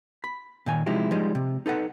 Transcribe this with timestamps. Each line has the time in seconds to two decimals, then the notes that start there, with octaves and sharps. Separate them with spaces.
0.24 B5
0.66 A#2 D#3 G#5
0.86 C3 F3 G#3 D#4 E4 G4
1.11 F3 G3 G#3 D#4
1.35 C3
1.66 D#4 A4 B4 F#5